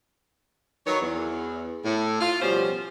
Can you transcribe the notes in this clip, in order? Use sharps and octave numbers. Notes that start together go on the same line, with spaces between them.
D#3 F#3 B4 C#5
E2
A2
F4
B2 F3 G3 C#4 G4 C5